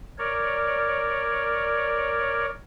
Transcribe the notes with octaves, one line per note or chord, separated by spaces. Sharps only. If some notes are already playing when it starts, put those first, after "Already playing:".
A#4 C#5 D5